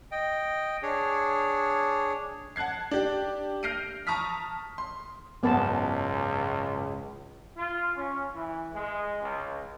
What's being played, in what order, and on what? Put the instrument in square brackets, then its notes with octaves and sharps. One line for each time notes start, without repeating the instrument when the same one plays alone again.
[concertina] D#5 G5
D4 G#4 C#5
[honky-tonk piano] F#5 A5 F#6 G#6 C7
D4 G4
F6 G6 A#6 C7 D7 D#7
A5 A#5 C#6 D#6 F6 B6
C6
[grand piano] G#1 F#2 [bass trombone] C#2 [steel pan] B3 A#4 A5
[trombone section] F4
C#4
E3
G#3
C#2